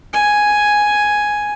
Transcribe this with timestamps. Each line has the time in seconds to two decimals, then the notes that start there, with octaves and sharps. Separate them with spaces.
0.14 G#5